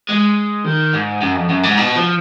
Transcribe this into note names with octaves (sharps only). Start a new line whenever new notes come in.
G#3
D#3
G#2
F#2
F2
F#2
G#2
B2
F3